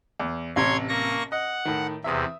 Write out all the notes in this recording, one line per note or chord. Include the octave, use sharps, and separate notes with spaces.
E2
A1 C3 C#5 A#5 C6 G#6
A#3 C#6 A#6
D#5 F#5
A2 D#3
E2 C3 E5 D#6